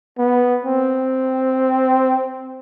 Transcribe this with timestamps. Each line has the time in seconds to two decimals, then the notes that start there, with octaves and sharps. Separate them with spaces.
0.18 B3
0.64 C4